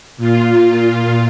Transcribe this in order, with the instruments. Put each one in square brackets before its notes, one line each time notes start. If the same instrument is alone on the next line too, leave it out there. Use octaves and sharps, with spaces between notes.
[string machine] A#2 F4